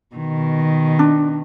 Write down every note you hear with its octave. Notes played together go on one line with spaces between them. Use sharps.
B2 D#3
D4